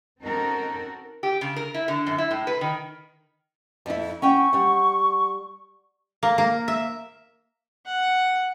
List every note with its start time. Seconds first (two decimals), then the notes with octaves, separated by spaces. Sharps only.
0.23 C4 C#4 D#4 F#4 A4 A#4
1.23 G4
1.41 C#3
1.56 A#4
1.74 E4
1.88 D3
2.07 F#2
2.18 E4
2.31 A2
2.47 B4
2.61 D#3
3.86 F2 E4
4.22 C#4 F#5 G5 C#6
4.53 G3 F#5
6.23 A#3
6.38 A#3
6.68 E5
7.86 F#5